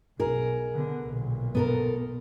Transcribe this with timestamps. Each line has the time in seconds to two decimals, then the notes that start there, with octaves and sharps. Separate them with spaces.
0.19 B1 G#4 A#4
0.73 D3 B3
1.05 B1 A#2
1.55 B3 A4 A#4